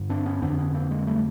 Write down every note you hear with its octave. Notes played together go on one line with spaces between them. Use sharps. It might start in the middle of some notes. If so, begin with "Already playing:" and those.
Already playing: G2 D3
C4 D4
B3 C#4
F2 D3 C4 D4
B3 C#4
A#3 C4
G#3 A#3
G3 A3